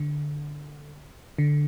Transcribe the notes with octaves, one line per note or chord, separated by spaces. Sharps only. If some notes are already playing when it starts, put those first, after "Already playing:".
Already playing: D3
D3